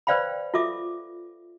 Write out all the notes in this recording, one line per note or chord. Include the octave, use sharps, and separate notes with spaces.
B4 C5 D5 F5 G5 B5
F4 A4 E5 D6 D#6